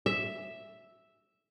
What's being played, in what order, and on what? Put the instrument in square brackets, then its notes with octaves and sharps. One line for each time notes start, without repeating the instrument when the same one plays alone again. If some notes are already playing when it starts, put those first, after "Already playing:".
[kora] E5